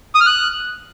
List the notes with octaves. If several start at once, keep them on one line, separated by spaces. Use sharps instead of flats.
D#6
F6
F#6